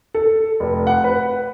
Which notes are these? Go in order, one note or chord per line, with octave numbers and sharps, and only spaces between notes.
A4
F1
F#5
B4